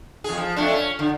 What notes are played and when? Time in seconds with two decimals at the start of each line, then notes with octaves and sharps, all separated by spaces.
0.24 F2 G#4
0.37 F3
0.56 F2 A3 D4
0.73 C#4
0.99 D3